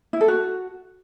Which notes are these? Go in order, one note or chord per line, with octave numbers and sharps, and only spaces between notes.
E4
A4
F#4